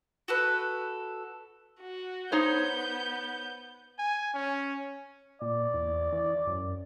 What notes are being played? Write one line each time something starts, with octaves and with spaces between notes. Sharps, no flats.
F#4 A4 B4
F#4
B3 D#4 C5 C#5 G6
G#5
C#4
A#2 D5
E2
E3
F#2